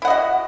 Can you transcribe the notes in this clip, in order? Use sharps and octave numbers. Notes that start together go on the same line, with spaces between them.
E4 F#4 D#5 F#5